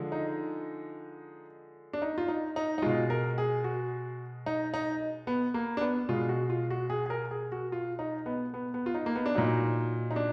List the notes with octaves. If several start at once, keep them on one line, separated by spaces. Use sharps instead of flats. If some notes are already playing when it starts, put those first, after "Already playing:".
Already playing: D3 F3 G#3
D#4
D4
D#4
F4
D#4
D#4
D#4
B2 G#3 F4
A#4
G#4
F#4
D#4
D#4
B3
A#3
D4
B3
B2 G#3 F4
F#4
F4
F#4
G#4
G#4
A#4
G#4
F#4
F4
D#4
B3
B3
B3
F4
D#4
A#3
B3
D4
A#2 F#3 D#4
D#4
D4